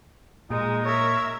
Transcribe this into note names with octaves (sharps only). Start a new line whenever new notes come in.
A#2 G#3 D#4
A#4 C#5 E5